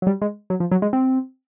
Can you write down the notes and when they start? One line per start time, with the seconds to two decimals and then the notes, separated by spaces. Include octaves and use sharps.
0.02 F#3
0.07 G3
0.22 G#3
0.50 F#3
0.60 F3
0.72 F#3
0.82 G#3
0.93 C4